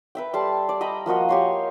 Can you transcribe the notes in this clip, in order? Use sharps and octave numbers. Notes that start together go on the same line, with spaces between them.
B4 E5 G5
G3 A4 A5 C6
D5
D#5 G5 A#5 B5
F3 A#3 F#4 D#5
G4 C#5 C6